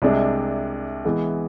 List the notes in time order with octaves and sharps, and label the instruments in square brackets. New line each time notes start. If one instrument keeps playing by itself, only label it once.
[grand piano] C2 C3 G#3 D4
E3 G#3 B3